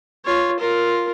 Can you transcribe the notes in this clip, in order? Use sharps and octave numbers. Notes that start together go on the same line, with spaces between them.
F4 C#5
F4 A#4